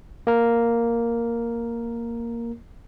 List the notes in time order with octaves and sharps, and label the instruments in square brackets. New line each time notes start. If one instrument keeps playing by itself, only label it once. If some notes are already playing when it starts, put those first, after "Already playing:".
[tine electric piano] A#3 A#4